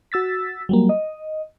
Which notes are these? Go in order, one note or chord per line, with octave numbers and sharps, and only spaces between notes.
F#4 E6 A6 B6
F#3 G3 A#3
D#5